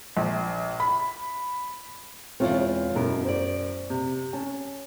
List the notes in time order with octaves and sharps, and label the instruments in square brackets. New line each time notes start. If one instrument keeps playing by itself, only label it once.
[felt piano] A#1
B5
[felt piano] E1 C4 F4 [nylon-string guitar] E2 C#3 C#5
[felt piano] F#2 [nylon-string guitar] B2 E4 A#4
[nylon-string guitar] C5 D5
[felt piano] C3
[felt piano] C#4 [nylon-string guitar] A5